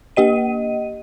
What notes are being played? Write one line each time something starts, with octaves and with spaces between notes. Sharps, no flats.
A#3 G4 D#5 D#7